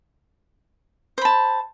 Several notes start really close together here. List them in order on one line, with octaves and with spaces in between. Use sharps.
C5 B5 A5